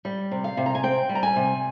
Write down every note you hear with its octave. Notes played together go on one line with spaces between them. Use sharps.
G3
C3
F5
C3
A#5
G#5
C4 G5
G3
A#5
G#5
C3